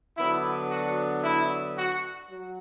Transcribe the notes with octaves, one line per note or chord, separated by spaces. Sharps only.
D3 F#3 B3 D4 E4
F#4
E4
F#4
F#3